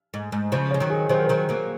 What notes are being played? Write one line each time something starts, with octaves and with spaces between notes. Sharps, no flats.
G#2
G#2
C#3 F3 C5
G#3 C#5
D#3 F#3
G#4
D#3 F#3 C5
A#4
D#3 F#3 C5
F#3 A#3